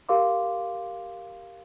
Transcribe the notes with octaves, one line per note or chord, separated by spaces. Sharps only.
G4 A#4 F5 C6 D6